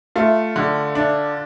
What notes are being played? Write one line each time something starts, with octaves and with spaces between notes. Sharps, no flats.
A3 F4
D3
D4